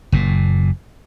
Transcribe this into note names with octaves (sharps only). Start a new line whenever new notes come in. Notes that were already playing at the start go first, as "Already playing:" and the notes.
F#1 A#2